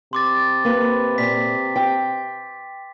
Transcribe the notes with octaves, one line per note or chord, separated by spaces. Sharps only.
C3 C6 D6 A6
A#3 B4
A#2 B6
G5